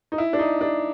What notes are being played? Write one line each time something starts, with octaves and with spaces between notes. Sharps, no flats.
D#4
E4
D4
D#4
D4